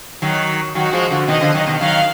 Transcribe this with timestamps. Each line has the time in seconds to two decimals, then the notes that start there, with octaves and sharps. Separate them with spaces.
0.22 D#3 F#3
0.75 D#3 F#3 F#4
0.93 F3 G#3
1.11 D3 F3
1.28 B2 D#3 D#5
1.41 D3 F3
1.54 D#3 F#3
1.67 B2 D#3
1.80 D#3 F#3 F5